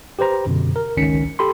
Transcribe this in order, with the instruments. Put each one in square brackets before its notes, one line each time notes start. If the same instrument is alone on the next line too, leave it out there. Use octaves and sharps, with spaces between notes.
[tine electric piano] G4 B4 C5 A#5
F#2 B2 D3
A#4
G#1 C#2 D#3 C#4 B6 C#7
G4 A4 B5 C6